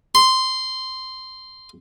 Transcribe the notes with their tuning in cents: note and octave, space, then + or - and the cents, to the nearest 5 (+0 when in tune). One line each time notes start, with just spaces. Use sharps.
C6 -10